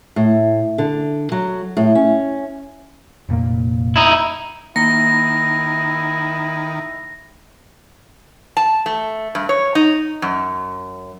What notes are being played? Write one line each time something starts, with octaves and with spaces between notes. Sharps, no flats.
A2
D3
F#3
A2
C#4
F1 A#2 A#3
D#4 E4
D#3 A#3 E4 A#6
A5
A3
G2
C#5
D#4
F#2